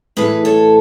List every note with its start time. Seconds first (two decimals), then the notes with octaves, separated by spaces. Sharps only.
0.17 A2 E3 G#4 B4
0.45 A4 C#5